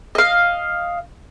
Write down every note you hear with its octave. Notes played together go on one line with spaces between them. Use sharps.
D#5 F5